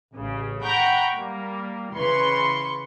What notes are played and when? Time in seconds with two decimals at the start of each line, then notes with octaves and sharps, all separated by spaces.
0.14 A1 C#3
0.64 F#5 G5 A#5 B5 C#6 G6
1.16 G3 A#3
1.96 C#3 E3 B4 C6 C#6